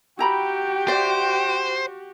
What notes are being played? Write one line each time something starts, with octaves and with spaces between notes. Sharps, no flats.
E4 F#4 G4 G5 A#5 B5
C5 D5 E5